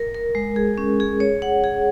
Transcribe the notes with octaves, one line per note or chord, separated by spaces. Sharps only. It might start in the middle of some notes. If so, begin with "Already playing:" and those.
Already playing: A#4
A#4
G#3
G#4
C#4
G#4
C#5
F#5
G#4